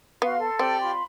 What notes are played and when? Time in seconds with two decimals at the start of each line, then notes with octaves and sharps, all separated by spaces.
0.22 B3 F#4 F5 C6
0.37 A4
0.59 C4 G4 D5 G5
0.81 F4 B5 C6